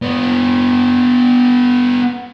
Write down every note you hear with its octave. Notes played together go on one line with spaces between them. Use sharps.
B3 D4